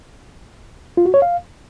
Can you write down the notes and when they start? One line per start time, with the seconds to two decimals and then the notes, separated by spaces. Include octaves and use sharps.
0.97 F4
1.06 F#4
1.14 C#5
1.22 F5